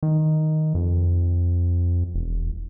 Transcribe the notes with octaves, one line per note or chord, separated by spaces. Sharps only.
D#3
F2
E1